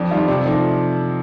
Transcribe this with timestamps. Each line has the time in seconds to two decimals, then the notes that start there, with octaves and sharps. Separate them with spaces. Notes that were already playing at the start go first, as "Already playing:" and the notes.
Already playing: F2 D4
0.11 D#3 G3 F4
0.28 C3 D4
0.45 F3 A3 D#4